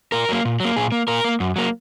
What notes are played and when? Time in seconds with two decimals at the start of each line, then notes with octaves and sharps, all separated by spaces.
0.12 A#2 A#4
0.29 F#3 A#3
0.45 A#2
0.60 F#3 A#3
0.76 A#2 G#4
0.92 A#3
1.08 A#2 A#4
1.24 A#3
1.40 F#2
1.56 F#3 A#3